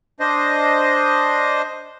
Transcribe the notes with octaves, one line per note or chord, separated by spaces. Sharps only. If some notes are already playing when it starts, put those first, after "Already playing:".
D4 C5 D#5